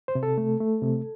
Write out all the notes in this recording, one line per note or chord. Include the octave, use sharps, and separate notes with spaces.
C5
C3
A4
A3
A3
C3